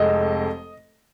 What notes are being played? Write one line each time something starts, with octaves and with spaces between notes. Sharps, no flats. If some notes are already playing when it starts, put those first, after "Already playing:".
Already playing: F1 F2 G#3 D#5